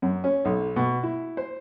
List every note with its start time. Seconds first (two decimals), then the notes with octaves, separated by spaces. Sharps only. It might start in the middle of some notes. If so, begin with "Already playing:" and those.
0.02 F#2
0.24 C#4
0.45 B1
0.76 B2
1.03 E4
1.37 C5